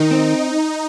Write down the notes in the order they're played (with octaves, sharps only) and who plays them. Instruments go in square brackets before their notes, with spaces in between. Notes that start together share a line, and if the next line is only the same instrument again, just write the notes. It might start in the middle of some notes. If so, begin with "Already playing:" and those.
Already playing: [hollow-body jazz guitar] D#3 [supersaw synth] D#4
[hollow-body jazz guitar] C4